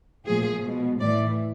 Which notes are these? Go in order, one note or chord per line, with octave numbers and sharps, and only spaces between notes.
A#2 F3 A3 G#4
B2 G#3
A2 E3 A3 D5